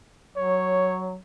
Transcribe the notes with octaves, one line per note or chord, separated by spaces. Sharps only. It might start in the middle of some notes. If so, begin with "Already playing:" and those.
F#3 C#5